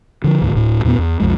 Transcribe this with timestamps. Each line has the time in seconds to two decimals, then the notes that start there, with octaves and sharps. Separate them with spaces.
0.24 D3 F3
0.41 C#2 G#2 D3
0.53 D1 A2
0.84 E2 A#2 A#3 B3
0.99 E2
1.20 B1 F2 G#3